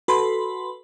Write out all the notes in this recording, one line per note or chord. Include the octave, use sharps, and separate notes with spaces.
F#4 A4 B4 B5 C6